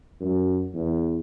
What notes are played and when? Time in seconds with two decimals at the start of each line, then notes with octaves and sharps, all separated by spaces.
0.21 F#2
0.74 E2